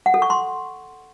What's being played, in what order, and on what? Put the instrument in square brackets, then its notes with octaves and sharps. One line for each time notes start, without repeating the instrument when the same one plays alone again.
[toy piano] F#5
A4
C#6
C6